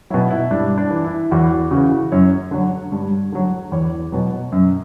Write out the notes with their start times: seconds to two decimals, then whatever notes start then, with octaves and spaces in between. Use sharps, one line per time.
0.10 B2 F#3 E4
0.31 E4
0.51 G2 D4
0.78 D4
0.90 E3
1.04 E4
1.31 E2 F#4
1.71 C#3 E3 F#4
2.12 F#2 C#5
2.51 D3 F#3
2.92 G2
3.32 D3 F#3
3.72 E2 C#5
4.12 B2 F#3
4.52 F#2